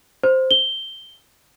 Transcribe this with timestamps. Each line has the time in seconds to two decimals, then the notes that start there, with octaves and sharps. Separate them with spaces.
0.23 C5
0.51 G7